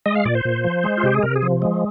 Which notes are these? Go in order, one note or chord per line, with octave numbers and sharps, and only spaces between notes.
G#3 D#5
F5
A#2 D5
C5
A#2
F3
G#3
F4
C3 G4
G#4
C3 A#4
G#4
F3
G#3